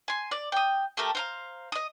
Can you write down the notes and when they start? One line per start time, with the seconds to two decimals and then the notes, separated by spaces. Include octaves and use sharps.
0.08 G#5 C6
0.31 D5
0.52 G5 D#6
0.97 A3 G4 A4 A#4
1.15 C5 F5 A#5
1.72 D#5 D#6